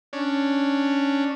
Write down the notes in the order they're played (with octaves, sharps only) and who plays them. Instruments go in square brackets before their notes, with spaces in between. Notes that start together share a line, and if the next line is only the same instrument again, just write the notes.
[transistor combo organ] C#4 D4